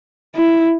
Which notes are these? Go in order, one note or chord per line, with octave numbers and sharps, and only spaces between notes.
E4